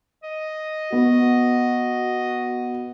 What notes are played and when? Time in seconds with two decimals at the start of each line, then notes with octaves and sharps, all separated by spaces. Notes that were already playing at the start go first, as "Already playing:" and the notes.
0.23 D#5
0.92 B3 F#4